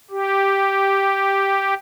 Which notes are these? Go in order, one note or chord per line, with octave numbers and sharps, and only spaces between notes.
G4